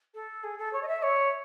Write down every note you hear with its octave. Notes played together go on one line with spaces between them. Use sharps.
A4
G#4
A4
C#5
D#5
E5
C#5